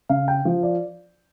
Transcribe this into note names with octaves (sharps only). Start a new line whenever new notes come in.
C#3 F5
G5
F3
D5